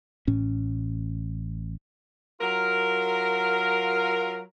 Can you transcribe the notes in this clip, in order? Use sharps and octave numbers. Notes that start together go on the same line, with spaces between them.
A1 A2 C#4
F#3 F4 A#4